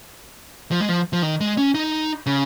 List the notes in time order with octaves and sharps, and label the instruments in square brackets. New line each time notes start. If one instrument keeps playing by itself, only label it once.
[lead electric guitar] F3
G#3
F3
F3
D#3
G#3
C#4
D#4
C#3